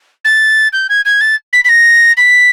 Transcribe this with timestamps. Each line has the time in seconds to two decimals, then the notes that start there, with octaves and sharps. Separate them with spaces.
0.25 A6
0.73 G6
0.89 G#6
1.05 G#6
1.21 A6
1.53 B6
1.64 B6
1.69 A#6
2.17 B6